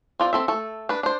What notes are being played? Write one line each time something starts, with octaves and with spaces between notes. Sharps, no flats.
C4 F4 D5
C4 A4 E5
A3 A4
D4 B4
D4 C5